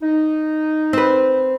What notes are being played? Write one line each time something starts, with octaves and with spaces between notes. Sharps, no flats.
D#4
C4 B4